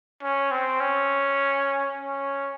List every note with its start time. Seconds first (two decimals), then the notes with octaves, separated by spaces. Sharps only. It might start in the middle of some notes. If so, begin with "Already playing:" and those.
0.23 C#4
0.51 C4
0.81 C#4
1.98 C#4